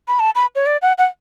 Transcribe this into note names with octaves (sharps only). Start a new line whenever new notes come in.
B5
A5
B5
C#5
D5
F#5
F#5